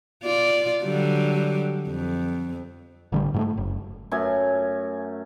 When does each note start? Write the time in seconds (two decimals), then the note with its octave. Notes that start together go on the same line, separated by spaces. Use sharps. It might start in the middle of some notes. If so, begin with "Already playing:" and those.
0.23 F4 D5
0.83 D3 F#3 G3
1.88 F2
3.12 A1 D3 G3
3.34 G#2 G3 A3
3.57 F#1
4.11 F#2 A3 G#5